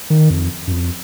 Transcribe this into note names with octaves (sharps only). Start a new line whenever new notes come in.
D#3
F2
F#2
F2